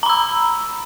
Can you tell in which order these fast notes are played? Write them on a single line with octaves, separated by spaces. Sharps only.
A#5 B5 E6